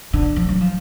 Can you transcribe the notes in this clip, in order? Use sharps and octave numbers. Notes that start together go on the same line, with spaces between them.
D3
F3
F#3
F3